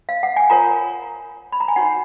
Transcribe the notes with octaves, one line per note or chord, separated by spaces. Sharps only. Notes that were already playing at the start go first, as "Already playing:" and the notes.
F5
F#5
G#5
F4 A#4 C#5 A#5
B5
A#5
G#5
D#4 F#4 C#5 F#5